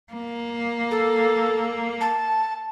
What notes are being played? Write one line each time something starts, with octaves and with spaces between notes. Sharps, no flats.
A#3
A4
A5